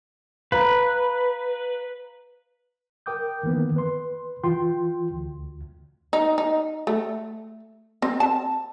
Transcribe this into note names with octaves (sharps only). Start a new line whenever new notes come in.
B4 F5 A#5
A#4 G5 D6 D#6 G6
D#3 E3 A#3 B3
B4 C6
E3 F4 G5 C6
D2
D#4
D#4
A3
C4
A5